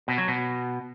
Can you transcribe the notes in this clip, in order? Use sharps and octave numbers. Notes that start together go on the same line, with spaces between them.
B2
F#3
B2